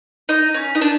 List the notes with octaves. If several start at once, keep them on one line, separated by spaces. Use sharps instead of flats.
D#4
C#4
D#4
D4